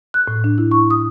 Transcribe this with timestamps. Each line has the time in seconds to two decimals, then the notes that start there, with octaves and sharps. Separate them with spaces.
0.14 F#6
0.28 A2
0.44 D4
0.58 E4
0.71 C#6
0.91 D#6